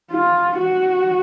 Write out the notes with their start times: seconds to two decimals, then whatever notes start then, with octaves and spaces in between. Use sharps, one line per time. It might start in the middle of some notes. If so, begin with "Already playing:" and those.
0.11 F4
0.58 F#4